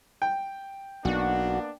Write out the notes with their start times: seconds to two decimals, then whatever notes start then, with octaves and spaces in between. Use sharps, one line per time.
0.22 G5
1.05 B1 A#3 B3 D4 F#4